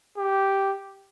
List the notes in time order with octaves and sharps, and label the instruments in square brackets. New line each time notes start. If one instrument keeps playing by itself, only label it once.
[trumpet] G4